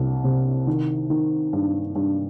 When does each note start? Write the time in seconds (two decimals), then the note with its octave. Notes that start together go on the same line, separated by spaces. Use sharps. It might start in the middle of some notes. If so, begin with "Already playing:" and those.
Already playing: C2
0.24 C3
0.67 D#3
1.10 D#3
1.53 G2
1.95 G2